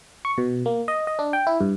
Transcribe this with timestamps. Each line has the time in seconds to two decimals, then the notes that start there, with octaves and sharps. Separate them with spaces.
0.25 C#6
0.38 B2
0.66 A#3
0.88 D#5
1.07 D#5
1.19 D4
1.33 G5
1.47 E4
1.60 G2